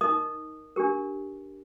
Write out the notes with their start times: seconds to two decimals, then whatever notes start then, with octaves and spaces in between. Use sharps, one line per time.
0.01 D#4 A#4 D#5 D#6
0.76 D4 G4 A#4